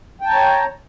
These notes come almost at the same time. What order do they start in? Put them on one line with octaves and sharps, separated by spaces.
G5 A5 A#5 C#5